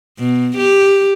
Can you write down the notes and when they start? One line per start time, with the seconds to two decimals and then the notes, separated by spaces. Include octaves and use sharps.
0.19 B2
0.57 G4